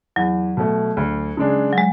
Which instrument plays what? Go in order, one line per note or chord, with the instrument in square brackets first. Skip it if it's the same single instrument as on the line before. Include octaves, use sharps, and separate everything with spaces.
[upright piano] E2 [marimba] F#3
[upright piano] B2 A3
D2
C#3 G#3 D4
[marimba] F#3
G#3